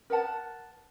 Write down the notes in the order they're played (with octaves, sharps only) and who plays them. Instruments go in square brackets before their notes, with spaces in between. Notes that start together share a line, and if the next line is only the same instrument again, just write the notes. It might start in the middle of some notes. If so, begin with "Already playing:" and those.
[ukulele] A#4 B4 F#5 A5